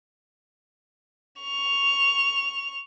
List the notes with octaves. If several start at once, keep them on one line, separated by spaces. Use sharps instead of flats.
C#6 F7